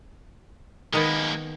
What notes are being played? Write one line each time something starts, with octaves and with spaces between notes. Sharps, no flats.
D#3 G#3 A#3 B3